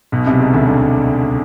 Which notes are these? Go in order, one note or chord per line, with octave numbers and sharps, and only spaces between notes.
B1 B2
C2 C3
C#2 C#3
D2 D3
D2 D3